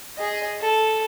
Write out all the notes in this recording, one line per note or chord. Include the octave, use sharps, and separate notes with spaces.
G#4 D#5
A4